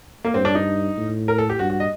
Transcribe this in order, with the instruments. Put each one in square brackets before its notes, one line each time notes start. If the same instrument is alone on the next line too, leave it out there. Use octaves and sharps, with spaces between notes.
[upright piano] A#3
[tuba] G2 [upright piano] C4
[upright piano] D4
D#4
[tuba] A2
[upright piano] A#4
A4
G4
[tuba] G2 [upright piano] F#4
[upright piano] F#4
D#5